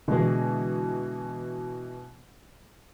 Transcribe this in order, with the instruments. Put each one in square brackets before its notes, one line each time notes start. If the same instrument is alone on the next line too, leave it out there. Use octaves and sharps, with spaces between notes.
[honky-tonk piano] B2 E3 [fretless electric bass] D3 G#3